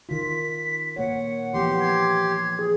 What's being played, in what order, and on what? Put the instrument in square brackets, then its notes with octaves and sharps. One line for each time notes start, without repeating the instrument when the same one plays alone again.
[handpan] D#3 F4 [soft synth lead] B6
[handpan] A#2 A#3 C#5 [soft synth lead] F#5
[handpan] E3 F3 B3 [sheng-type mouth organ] G4 C6
[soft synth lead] G#6
G#4